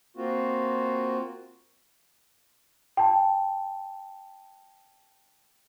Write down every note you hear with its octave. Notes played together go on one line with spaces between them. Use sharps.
A#3 C4 F4 F#4
G5 A5